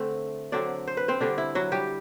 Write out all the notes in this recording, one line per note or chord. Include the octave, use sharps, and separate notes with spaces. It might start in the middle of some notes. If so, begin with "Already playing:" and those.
Already playing: D3 A3 C4
D3 F#3 C4 D4 D5
C5
B4
C4 C5
D3 G3 C4 D4
E4
F#3 F#4
G3 G4